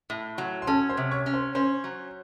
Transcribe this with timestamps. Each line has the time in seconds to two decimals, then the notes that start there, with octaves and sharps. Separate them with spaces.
0.10 A2
0.38 F#3
0.62 C6
0.67 C#4 A4 A5
0.89 C5 C6
0.97 C3
1.11 C#5 C#6
1.26 C#4
1.34 C5 C6
1.55 C#4 C5 C6
1.84 F#3